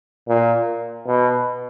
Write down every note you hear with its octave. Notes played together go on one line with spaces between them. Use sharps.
A#2
B2